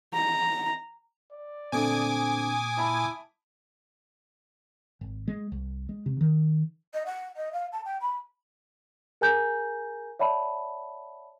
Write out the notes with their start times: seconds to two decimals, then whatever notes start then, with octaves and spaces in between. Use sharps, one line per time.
0.14 A#5
1.33 D5
1.72 A#2 D3 A3 C4 G#5 D6 D#6
2.78 E4 A5 B5
5.01 G#1
5.28 G#3
5.52 C2
5.89 G#3
6.06 C3
6.21 D#3
6.94 D#5
7.06 F#5
7.37 D#5
7.53 F5
7.72 A5
7.85 G5
8.01 B5
9.21 G#4 A#4 G#5 A#5 G6
10.19 C#5 D5 E5 F#5 A5 B5